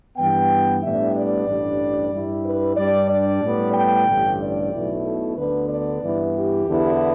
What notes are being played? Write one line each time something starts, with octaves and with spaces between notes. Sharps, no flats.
G2 E3 B3 G5
A2 G3 B3 D4 E5
D5
A1 G2 G3 D4
G2 G3 E4
B4
G2 G3 D4 D5
D5
A2 G3 B3
G5
A1 G2 D3
D5
B1 B2 A3 E4
A4
D2 D3 B3 D4 B4
D5
G2 E3 B3 E4
G4
E2 D3 B3 E4